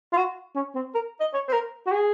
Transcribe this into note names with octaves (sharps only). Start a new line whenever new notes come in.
F4
F#4
C#4
C4
A#4
D#5
C#5
C5
A#4
F#4
G#4